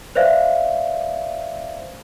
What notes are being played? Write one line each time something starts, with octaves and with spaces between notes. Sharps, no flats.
B4 C5 D5 E5 F5